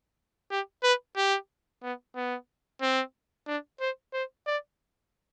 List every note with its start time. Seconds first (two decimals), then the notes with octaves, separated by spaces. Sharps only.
0.51 G4
0.83 B4
1.16 G4
1.83 B3
2.15 B3
2.81 C4
3.47 D4
3.80 C5
4.13 C5
4.47 D5